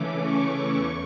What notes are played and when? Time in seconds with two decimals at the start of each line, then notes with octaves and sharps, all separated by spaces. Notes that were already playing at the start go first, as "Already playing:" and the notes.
Already playing: C#3 E3 A3 C#4 D6
0.23 C#6
0.74 E2